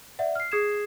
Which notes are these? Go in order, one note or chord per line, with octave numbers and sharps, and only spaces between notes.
D5 E5 F#5
F6 C7
G#4 D#6 G#6 C7 E7